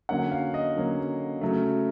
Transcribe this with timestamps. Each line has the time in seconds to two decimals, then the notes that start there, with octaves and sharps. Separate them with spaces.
0.09 D3 F#3 A#3 C#4 F#5
0.32 F5
0.54 D#5
0.76 D3 F#3 A#3 C#4
1.41 C#3 F#3 A3